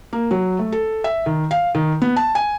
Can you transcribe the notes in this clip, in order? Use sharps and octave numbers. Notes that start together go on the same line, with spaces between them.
A#3
F#3
A3
A4
E5
D#3
F5
D#3
B3
A5
G#5